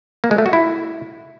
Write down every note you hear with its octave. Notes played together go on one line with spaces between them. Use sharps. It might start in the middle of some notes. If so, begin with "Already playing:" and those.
A#3
G#3
A3
F#4
E4